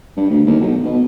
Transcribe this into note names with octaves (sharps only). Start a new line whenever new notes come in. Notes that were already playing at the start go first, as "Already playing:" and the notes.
G2
D2
D#2
B1
B2